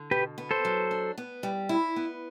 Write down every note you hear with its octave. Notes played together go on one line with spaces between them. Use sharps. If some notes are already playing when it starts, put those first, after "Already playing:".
Already playing: D3
B2 G4 B4
B3
A4 C5
F#3
D4
B3
G3
E4
B3